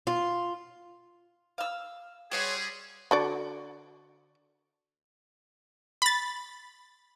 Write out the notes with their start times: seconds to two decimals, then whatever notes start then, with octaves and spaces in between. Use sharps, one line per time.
0.07 F4
1.58 F5 E6
2.32 G3 F#4 G#4 C#5 C6
3.11 D3 F#4 D5
6.02 B5 A6